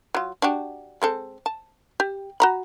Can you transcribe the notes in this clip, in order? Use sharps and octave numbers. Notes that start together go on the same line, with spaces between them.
F#3 F4
D4 F#4 G4
G#3 C4 A4
A5
G4
F#4 A#5 B5